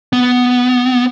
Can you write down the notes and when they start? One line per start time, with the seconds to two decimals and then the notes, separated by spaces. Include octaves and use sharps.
0.13 B3